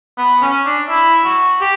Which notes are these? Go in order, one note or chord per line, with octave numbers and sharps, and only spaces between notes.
B3
C#4
D4
E4
F#4
G4